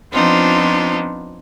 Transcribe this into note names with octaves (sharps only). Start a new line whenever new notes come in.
F3 B3 C4 D4 D#4 F4